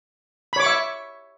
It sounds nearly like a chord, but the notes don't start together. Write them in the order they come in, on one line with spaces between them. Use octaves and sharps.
B5 C#5 D6 C#6 E5